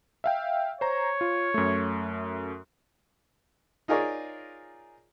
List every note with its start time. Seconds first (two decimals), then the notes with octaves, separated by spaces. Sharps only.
0.24 E5 F5 G5
0.81 C5 C#5 A#5
1.21 F4
1.54 F#2 A3
3.88 D#4 F4 G#4 A#4 C#5 D5